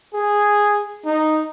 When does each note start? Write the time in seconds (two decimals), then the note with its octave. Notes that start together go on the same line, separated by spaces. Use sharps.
0.14 G#4
1.06 D#4